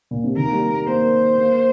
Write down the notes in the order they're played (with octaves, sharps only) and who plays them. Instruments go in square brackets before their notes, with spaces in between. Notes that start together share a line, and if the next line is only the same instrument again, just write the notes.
[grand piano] A#2
C3
[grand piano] D#3 [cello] A#4
[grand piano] A#3
G3
A#3
[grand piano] A#3 [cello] C5
[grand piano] A#3